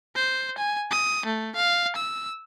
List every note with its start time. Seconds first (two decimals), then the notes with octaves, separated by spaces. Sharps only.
0.16 C5
0.58 G#5
0.91 D#6
1.26 A3
1.56 F5
1.96 E6